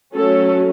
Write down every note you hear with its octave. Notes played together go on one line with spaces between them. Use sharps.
F#3 A3 C#4 A4